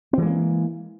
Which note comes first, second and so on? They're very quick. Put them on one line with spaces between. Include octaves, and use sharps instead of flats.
C4 E3 G#3 A#3